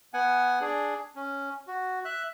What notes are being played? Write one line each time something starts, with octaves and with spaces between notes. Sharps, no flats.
B3 F#5 G#5
D4 G#4
C#4
F#4
E5 F#6